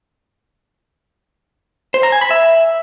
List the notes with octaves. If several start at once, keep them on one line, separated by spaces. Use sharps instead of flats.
C5
A#5
G#5
B5
E5